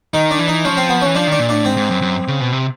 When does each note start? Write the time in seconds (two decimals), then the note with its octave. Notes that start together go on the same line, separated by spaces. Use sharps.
0.14 D#3 D#4
0.31 D4
0.39 E3
0.48 D#4
0.65 F3 C#4
0.77 C4
0.89 B3
1.01 E3 C#4
1.15 F3 D4
1.27 D#3 D4
1.39 A#2
1.49 A2 D4
1.65 G#2 C4
1.77 G#2
1.90 F#2
2.02 F#2
2.28 C#3
2.41 B2
2.52 C3